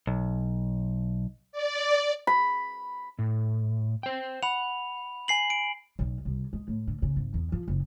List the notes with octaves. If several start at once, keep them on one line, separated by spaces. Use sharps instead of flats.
B1
D5
B5
A2
C5 G5
F#5 B5 F7
G#5 C7 F#7
D7
B1
C2
G#3
A2
D3
C#3
G#1
E2
F3
F#1